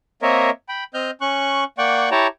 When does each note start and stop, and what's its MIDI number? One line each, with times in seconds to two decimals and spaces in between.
0.22 0.50 58
0.22 0.50 60
0.22 0.50 70
0.22 0.50 73
0.22 0.50 75
0.22 0.50 76
0.69 0.84 79
0.69 0.84 83
0.94 1.11 60
0.94 1.11 75
0.94 1.11 89
0.94 1.11 91
1.21 1.64 61
1.21 1.64 85
1.21 1.64 90
1.78 2.09 58
1.78 2.09 74
1.78 2.09 78
1.78 2.09 79
1.78 2.09 85
1.78 2.09 90
2.11 2.27 64
2.11 2.27 67
2.11 2.27 73
2.11 2.27 79
2.11 2.27 81
2.11 2.27 82